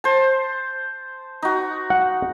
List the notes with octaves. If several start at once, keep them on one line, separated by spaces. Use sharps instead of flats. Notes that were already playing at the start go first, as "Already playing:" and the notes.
C5 A5
D#4 F#4
F#5